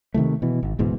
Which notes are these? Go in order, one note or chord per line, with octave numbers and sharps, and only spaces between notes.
C3 D#3 E3 A3
B2 E3
G#1
D1 G#2 B2 E3